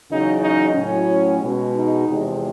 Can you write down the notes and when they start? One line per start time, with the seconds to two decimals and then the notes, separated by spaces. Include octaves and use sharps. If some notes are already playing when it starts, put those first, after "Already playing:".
0.09 E2 C#3 F#3 D#4
0.42 D#4
0.75 A2 F#3 C#4
1.40 B2 G#3
1.74 D#4
2.06 E2 C3 F3 G#3